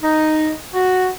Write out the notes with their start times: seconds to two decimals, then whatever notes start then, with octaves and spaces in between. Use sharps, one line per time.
0.02 D#4
0.74 F#4